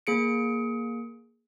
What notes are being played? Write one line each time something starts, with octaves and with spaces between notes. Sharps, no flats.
A#3 G#4 C#7 D7